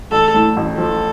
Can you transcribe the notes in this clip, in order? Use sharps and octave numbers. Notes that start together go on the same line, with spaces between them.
A1 A4
A2
A1
F3 A4